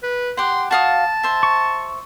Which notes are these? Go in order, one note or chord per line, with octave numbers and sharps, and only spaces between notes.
B4
G4 F#5 C6
F#4 F5 A5 D#6
C5 E5
C#6